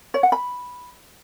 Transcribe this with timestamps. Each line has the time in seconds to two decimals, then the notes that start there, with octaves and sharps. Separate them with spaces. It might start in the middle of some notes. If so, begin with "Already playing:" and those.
0.14 C#5
0.23 F#5
0.32 B5